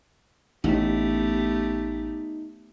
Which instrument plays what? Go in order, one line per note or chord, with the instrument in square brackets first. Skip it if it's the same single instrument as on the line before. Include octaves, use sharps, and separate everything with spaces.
[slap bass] A1 [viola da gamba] A3 B3 G4 [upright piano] D#4